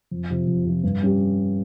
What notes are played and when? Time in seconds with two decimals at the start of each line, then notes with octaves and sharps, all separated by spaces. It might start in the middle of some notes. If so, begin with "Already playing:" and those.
0.11 F2
0.30 C3 F3
0.48 F2
0.65 C3 F3
0.84 G2
1.01 G3 C#4 G4